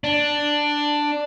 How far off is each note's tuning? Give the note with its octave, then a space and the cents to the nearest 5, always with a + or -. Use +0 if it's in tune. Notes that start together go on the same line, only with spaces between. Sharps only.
D4 +5